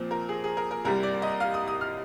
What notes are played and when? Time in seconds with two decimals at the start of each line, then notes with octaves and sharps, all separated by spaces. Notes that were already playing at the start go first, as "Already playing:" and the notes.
Already playing: A#2 F3 C4
0.11 A#4
0.29 G#4
0.44 G#4
0.57 A#4
0.71 A#4
0.85 C2 C3 G3 A#4
1.03 D5
1.22 D#5
1.40 F5
1.54 D#6
1.68 D#6
1.81 F6